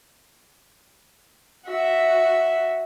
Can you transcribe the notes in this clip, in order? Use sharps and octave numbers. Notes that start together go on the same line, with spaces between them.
F#4 E5